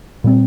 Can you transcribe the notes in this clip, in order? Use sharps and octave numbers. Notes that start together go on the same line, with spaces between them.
A#2 G3 C4